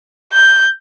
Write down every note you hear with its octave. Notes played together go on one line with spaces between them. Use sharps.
G6